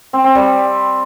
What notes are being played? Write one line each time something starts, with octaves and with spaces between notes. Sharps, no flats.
C4
C4
G3